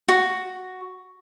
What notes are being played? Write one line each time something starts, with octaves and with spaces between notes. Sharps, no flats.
F#4